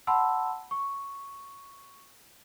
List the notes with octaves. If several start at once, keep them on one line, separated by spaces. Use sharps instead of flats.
F#5 A5 B5 C6 E6
C#6